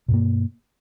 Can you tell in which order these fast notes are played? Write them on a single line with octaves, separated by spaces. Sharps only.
B2 G2 A#3